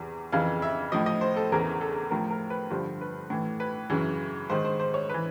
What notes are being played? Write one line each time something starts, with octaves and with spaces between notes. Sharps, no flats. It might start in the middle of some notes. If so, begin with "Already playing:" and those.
Already playing: E2 C3 E3
F2 C#3 E3 F5
E5
A2 F3 D#5
D#5
C5
A4
E2 C#3 E3 A#4
A4
A2 F3 A#4
A#4
B4
G2 D3 F3 C5
B4
A2 E3
B4
F#2 C#3 E3
G#2 D#3 C5
C5
C5
C#5
E3 B4